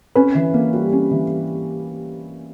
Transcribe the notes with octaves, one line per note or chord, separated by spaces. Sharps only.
C#4 B4
E3
A#3
G3
C#4
E3